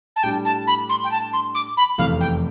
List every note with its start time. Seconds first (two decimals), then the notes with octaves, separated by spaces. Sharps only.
0.16 A5
0.23 A2 G3 D4 G4 G5
0.45 A5
0.67 B5
0.89 C6
1.03 G5
1.11 A5
1.33 C6
1.54 D6
1.77 B5
1.98 F1 E2 C3 E3 A3 F5
2.20 G5